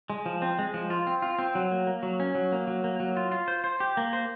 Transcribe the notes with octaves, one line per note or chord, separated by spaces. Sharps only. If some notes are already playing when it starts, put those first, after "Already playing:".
G#3
F3
C4
G#3
F3
F4
C4
F4
C4
F#3
A#3
A#3
F#3
C#4
F#3
A#3
F#3
A#3
F#3
F4
F4
C5
C5
G4
A#3
C5